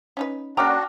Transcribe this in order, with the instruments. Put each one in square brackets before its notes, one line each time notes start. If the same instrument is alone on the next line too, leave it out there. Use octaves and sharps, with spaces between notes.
[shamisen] C#4 D#4 B4
[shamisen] A#3 C#4 A#5 [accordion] D4 F#4 [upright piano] G5 D6 F6